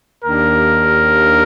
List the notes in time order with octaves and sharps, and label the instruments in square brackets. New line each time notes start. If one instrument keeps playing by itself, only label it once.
[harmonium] D#2 D#3 A#3 D4 G4 [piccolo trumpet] A#4